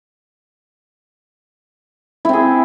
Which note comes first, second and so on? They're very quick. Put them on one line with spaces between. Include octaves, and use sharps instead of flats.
E4 C4 G#4